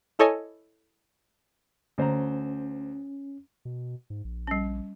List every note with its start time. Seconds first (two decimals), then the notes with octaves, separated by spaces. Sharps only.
0.19 E4 A4 C#5 D#5 G#5 A5
1.98 D2 C#4 C5 A#5
3.65 B2
4.10 G#2
4.25 A#1
4.47 G3 C#4